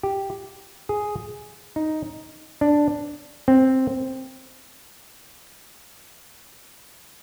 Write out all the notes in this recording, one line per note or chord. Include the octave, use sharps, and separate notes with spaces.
G4
G#4
D#4
D4
C4